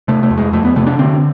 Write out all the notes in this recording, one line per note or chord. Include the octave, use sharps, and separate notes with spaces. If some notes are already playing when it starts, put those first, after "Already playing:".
C3 A3
A3
F2
G#3
F2 A3
B3
C3 A3
D4
D3 C4